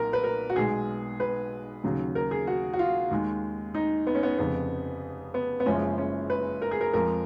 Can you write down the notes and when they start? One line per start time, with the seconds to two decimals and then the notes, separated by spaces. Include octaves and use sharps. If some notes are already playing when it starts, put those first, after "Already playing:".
Already playing: B1 A#2 F#3 A#4
0.13 B4
0.24 A#4
0.50 F#4
0.56 B1 B2 G#3 G#4
1.20 B4
1.84 D#2 C#3 F#3
2.15 A#4
2.31 G#4
2.47 F#4
2.73 F#4
2.79 F4
3.11 D#2 D#3 G#3
3.74 D#4
4.07 B3
4.15 C#4
4.23 B3
4.38 F1 F2 C#3 B3
5.34 B3
5.60 B3
5.66 F#1 F#2 F3 G#3 C#4
5.98 C#4
6.30 B4
6.62 A#4
6.71 G#4
6.81 A#4
6.93 F2 F3 G#3 A#4